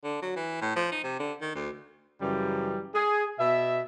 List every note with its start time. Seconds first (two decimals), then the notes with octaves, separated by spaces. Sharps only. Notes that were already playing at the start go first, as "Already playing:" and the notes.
0.04 D3
0.22 F#3
0.36 E3
0.62 A2
0.76 F3
0.92 D#4
1.04 C3
1.20 D3
1.42 D#3
1.55 D2
2.20 F#2 C#3 E3 G3
2.95 G#4
3.39 B2 E5